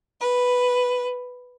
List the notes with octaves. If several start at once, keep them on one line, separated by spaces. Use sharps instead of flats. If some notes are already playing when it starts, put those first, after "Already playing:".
B4